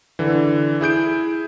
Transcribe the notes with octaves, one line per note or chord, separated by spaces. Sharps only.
D3 E3
E4 G#4 G6 D7